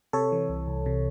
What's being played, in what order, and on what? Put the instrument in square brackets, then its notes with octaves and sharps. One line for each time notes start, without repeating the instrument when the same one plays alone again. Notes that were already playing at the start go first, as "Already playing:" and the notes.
[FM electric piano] C3 A4 C#5
E3
C2
C2
C3